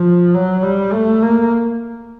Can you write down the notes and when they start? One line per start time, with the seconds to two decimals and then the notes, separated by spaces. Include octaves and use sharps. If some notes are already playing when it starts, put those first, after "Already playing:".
Already playing: F3
0.35 F#3
0.63 G3
0.93 A3
1.23 A#3